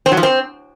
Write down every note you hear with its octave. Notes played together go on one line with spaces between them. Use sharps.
C4
F#3
F3
C4